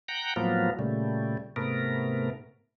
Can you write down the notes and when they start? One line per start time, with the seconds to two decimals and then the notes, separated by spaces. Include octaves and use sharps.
0.08 F#5 G5 A#5
0.36 A2 F3 F#3 A#3 B3 F4
0.79 A#2 C#3 G3 A3
1.56 G#2 C3 A3 B3 A#4